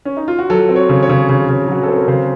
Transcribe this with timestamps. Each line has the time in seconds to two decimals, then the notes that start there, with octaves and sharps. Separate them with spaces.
0.05 C#4
0.17 D#4
0.28 F4
0.39 F#4
0.50 F#3 A4
0.69 C4
0.76 C#5
0.89 C#3
1.03 C#5
1.09 C#3
1.29 C#3
1.49 C#3
1.68 F#3 F#4
1.83 C4 A4
1.96 A#4
2.08 C#3 C5